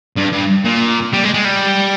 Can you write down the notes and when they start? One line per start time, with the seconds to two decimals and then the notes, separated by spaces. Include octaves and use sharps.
0.17 G2
0.33 G2
0.65 A#2
1.13 G3
1.24 G#3
1.34 G#3
1.45 G3